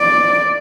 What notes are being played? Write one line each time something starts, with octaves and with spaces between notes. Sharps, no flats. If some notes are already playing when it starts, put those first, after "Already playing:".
Already playing: D5